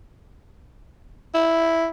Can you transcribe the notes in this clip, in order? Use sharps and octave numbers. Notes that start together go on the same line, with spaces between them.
E4